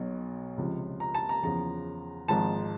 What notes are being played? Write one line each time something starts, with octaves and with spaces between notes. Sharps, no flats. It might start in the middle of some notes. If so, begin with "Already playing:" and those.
Already playing: B1 B2 F#3
C#2 C3 F3
A#5
A5
A#5
E2 C#3 F3 A#5
G#1 G#2 F3 A5